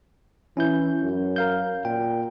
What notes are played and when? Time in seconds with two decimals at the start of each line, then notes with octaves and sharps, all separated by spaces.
0.57 E3 C#4 E4 G6
1.03 F#2
1.36 A#4 F5 G6
1.85 A#2 G5